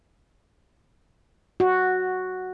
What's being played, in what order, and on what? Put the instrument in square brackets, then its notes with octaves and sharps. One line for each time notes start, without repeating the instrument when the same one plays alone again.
[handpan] F#4